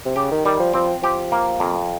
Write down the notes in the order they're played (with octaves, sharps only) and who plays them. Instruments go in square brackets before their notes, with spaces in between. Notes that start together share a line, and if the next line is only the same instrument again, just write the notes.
[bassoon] C3
[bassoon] C#3 [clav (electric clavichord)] G4
[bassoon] D#3
[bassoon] D#3 [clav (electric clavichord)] G3
[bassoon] F3
[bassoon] F3 [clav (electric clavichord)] C4
[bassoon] F3 [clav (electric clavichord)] G4
[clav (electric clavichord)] A#3
F2